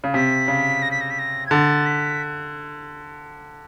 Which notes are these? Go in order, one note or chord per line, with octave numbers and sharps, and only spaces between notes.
C#3
C3 B6
C#3
A#6
B6
A#6
B6
A#6
G#6
D3 A6
B6